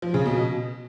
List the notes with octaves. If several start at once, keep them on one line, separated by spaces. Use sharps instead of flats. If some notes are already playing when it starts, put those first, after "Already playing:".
F3
C#3
B2